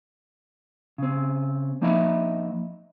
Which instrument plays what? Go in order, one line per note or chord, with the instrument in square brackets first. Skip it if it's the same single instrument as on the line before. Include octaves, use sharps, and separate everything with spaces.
[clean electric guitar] C#3 C4
F3 A#3 D#4 D#5 E5 B5